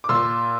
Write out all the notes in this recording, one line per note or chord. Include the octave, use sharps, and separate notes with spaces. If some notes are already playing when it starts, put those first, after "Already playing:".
D6
A#2 C6 E6